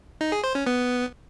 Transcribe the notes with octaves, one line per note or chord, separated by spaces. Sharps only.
D#4
G#4
C5
C#4
B3